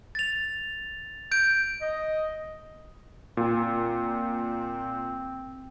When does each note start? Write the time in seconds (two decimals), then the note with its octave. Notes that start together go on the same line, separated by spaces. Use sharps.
0.15 A6 F7
1.31 G6 D7
1.81 D#5
3.37 A#2 C4